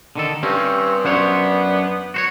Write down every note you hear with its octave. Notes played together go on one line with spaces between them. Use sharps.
D3 D#3 A4
G2 C4 C#4
F#2 B3 D4 C5 C#5
F#4 C5 C#5